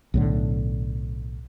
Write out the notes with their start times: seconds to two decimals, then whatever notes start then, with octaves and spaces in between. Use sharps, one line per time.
0.14 B1 A2 D3